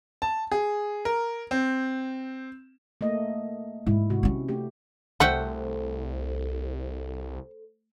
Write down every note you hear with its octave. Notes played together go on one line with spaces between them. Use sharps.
A5
G#4
A#4
C4
A3 A#3 D#5
G#2 E4
C3 F#4
C4 C#4
A3 G4
C2 A3 F#4 A4 C5 F#5 G5